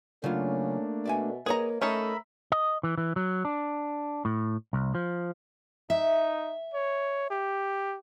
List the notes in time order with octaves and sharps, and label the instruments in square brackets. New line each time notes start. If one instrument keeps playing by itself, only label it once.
[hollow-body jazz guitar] C#3 F#3 F4 [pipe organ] A3 A#3 D4 [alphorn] C#4
[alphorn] B2 [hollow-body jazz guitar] D5 E5 G#5
[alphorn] A#3 [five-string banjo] G#4 A#5 [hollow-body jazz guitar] B4 C#5 D#5
[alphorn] A3 [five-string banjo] C#4 D#4 A4 [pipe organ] A#4 E5 B5
[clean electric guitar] D#5
E3
E3
F#3
D4
A2
C2
F3
[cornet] D#4 [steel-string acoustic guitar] E5
[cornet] C#5
G4